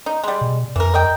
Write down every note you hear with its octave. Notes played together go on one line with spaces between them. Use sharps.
D#4
G3 G#3
B2
F2 E3 A#4
A#4 D#5 G5